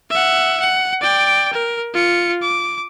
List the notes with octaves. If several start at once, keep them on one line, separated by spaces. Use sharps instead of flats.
E5 F#5
F#5
D5 G5
A#4
F4 C#7
D6